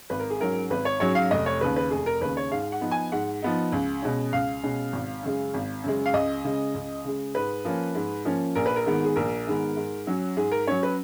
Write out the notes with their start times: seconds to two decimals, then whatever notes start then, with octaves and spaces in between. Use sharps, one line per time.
0.10 G#1 B4
0.20 A#4
0.30 G#4
0.40 G#2 F#3 C#4 A#4
0.70 G#1 B4
0.85 C#5
1.00 G#2 F#3 C#4 C#5
1.15 F5
1.31 F1 D#5
1.46 C#5
1.61 D#2 C#3 B4
1.76 B4
1.91 F1 G#4
2.06 A#4
2.21 D#2 C#3 B4
2.37 C#5
2.51 G#2 F5
2.72 F#5
2.81 F3 B3 D#4
2.91 G#5
3.12 G#2 F#5
3.42 F3 B3 D#4
3.72 C#2
4.02 B2 G#3 C#4
4.33 C#2 F5
4.63 B2 G#3 C#4
4.93 G#1
5.23 F#2 C#3 G#3
5.54 G#1
5.84 F#2 C#3 G#3
6.06 F5
6.13 C#2 D#5
6.44 C#3 G#3
6.74 C#2
7.05 C#3 G#3
7.35 G#2 B4
7.65 F3 A#3 C#4
7.95 G#2
8.25 F3 A#3 C#4
8.55 A#1 A#4
8.66 B4
8.76 A#4
8.86 G#2 D#3 G#3 B3
9.05 G#4
9.16 A#1 A#4
9.47 G#2 D#3 G#3 B3
9.76 G#2
10.07 F#3 C#4
10.37 G#2 G#4
10.52 A#4
10.67 F#3 C#4 C#5
10.83 B4